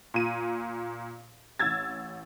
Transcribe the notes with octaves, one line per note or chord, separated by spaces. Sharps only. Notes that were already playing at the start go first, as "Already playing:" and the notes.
A#2 D#7
A1 E6 G#6 A6